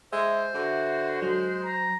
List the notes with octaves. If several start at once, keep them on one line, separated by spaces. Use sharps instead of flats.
G#3 C5 E5
D3 F#4
F#3 G#3
A#5